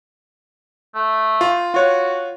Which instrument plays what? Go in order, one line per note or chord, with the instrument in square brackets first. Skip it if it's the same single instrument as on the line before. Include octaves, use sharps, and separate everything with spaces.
[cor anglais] A3
[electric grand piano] F4
[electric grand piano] F4 C#5 [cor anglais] F#4